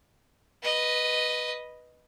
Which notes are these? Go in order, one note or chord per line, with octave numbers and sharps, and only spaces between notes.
B4 D#5